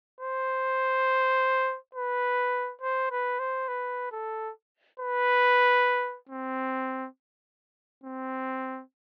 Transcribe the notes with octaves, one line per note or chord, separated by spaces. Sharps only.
C5
B4
C5
B4
C5
B4
A4
B4
C4
C4